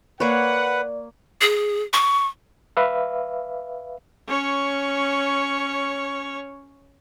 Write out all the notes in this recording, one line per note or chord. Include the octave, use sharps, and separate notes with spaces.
A#3 B4 C#5 D5 F#5
G#4
C#6
B4 E5 F5
C#4 C#5